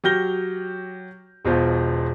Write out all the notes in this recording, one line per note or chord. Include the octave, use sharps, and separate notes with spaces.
F#3 G4 F6 G6 A#6 G7
E1 B2 F4 C5